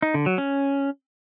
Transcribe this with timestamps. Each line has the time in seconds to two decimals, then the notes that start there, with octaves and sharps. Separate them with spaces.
0.02 D#4
0.14 D3
0.26 F#3
0.38 C#4